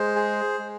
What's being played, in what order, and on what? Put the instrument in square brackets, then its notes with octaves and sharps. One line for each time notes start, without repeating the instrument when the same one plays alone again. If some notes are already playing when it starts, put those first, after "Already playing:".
Already playing: [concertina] G#3 C5
G#4
G#3